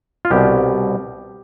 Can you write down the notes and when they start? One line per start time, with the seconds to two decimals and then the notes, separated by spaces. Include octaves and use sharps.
0.25 F4
0.31 C2 B2 G4